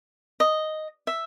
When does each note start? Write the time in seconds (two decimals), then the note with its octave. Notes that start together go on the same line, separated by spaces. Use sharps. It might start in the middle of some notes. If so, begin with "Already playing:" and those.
0.40 D#5
1.07 E5